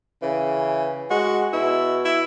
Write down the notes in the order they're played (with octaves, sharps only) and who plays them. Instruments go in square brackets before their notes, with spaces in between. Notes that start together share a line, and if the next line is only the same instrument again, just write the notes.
[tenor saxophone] C#3 [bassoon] E3
[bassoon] G#3 [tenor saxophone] F#4
[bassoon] B2 [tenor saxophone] E4
[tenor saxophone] E4